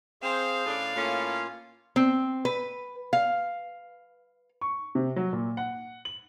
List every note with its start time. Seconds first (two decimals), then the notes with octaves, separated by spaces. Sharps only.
0.23 C4 G#4 C5 F5
0.66 A2 C#4 D4
0.96 A2 A#3 C#4 F4
1.96 C4
2.45 B4
3.13 F5
4.61 C#6
4.95 C3
5.16 F#3
5.33 A#2
5.57 F#5
6.05 F#7